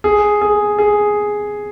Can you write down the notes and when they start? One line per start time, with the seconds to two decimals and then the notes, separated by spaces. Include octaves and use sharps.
0.04 G#4
0.42 G#4
0.79 G#4